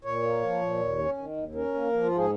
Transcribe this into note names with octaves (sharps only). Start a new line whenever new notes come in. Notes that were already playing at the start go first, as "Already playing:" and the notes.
A#2 C#5
A#3
F3
A#2
D#2
C#4
D#3
D#2
C#4 A#4
A#3
F3
F4
G#2
G#4